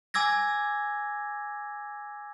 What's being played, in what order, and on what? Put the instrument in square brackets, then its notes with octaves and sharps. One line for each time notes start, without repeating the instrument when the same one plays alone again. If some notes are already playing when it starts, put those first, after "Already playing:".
[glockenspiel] G#5 D6 E6 G#6 A#6